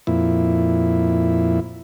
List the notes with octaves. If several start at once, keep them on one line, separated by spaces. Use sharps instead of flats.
F2 A#2 E4